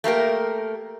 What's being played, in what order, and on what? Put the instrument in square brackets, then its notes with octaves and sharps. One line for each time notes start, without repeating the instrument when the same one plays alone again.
[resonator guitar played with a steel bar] A3 A#3 G4 A#4